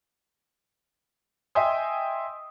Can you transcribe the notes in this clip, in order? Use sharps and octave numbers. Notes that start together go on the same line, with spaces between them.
D#5 E5 G5 G#5 C6 D#6